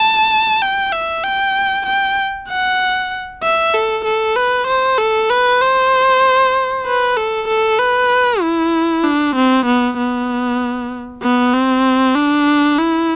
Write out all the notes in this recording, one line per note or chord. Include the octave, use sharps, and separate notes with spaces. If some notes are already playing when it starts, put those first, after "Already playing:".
Already playing: A5
G5
E5
G5
G5
F#5
E5
A4
A4
B4
C5
A4
B4
C5
B4
A4
A4
B4
E4
D4
C4
B3
B3
B3
C4
D4
E4